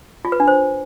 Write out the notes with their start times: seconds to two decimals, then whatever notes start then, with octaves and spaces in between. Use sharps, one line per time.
0.25 F4
0.32 B4
0.40 D4
0.48 C5